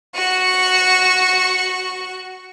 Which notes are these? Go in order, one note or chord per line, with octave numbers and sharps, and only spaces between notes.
F#4 C#6